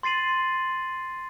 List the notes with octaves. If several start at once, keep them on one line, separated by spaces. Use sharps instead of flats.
C6 A6 C7 D#7 F#7